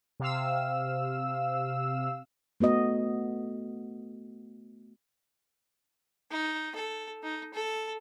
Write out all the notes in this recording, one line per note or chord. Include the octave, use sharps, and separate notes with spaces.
C3 F5 E6
A3 B3 F#4 D#5
D#4
A4
D#4
A4